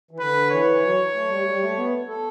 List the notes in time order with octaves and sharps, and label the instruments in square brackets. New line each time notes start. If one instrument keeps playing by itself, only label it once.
[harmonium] E3
[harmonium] D3 [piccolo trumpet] B4
[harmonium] E3 [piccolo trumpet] C#5
[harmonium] F#3
A3
G3
G3
A3
B3
A4